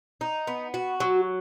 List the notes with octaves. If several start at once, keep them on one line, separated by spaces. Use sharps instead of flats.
D#4
B3
F#4
F#3